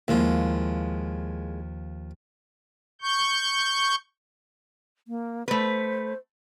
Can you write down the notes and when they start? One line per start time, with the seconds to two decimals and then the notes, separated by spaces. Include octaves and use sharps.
0.08 D#2 F3 G#3 A#3 E4
3.02 C#6 G6
5.08 A#3
5.48 A3 B4 C5